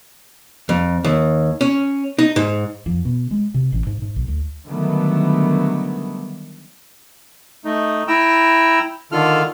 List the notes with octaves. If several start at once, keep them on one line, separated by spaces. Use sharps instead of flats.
F2
D#2
C#4
D#4
G#2
F2
B2
G#3
C3
A1
G#2
G#2
B1
D2
D3 D#3 F#3 G3 A3 B3
A3 D#4
E4 G5 A#5 E6
D3 D#3 F4 A4 F6